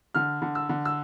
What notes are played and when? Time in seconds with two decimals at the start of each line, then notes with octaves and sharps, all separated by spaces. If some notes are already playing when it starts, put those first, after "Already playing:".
0.14 D3 F6
0.42 D3
0.55 E6
0.69 D3
0.85 E6